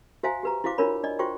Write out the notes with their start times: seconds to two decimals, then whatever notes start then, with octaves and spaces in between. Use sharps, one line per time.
0.23 F#4 C5 E5 F5 G#5 A#5
0.43 G4 B4 A#5
0.64 E4 F#4 C5 F5 D6
0.78 D4 F4 A#4 C#5 B5
1.03 D4 D5 D#5
1.19 F4 F#4 C5 G5 C#6